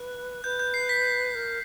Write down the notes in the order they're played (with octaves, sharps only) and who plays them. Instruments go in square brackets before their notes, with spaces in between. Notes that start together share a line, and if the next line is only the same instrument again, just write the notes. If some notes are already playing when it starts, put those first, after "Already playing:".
Already playing: [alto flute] B4 [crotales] F#6
[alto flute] B4 [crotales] G6
[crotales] G6
C7
B6
[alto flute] A#4